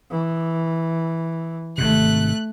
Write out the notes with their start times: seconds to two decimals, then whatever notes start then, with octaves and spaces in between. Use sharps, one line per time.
0.10 E3
1.78 G#1 G#2 C3 A3 F#6